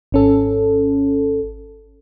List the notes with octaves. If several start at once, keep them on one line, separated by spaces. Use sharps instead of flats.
G#1 C#4 A4